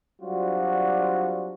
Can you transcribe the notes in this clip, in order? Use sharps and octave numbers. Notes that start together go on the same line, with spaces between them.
F#3 G3 C4 D4 F4 F#4